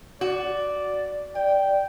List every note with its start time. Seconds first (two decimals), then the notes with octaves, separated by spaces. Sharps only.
0.21 F#4 D5
1.35 D5 G5